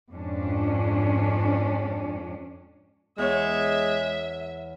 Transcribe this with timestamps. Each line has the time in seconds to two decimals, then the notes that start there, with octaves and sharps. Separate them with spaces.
0.10 F2 G#2 C#4 D4
3.18 E2 G#3 C#5 E5